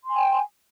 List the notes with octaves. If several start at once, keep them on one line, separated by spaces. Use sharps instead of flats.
G5 G#5 C6